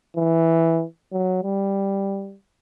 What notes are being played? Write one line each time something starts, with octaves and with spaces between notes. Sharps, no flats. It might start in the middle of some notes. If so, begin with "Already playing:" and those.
E3
F#3
G3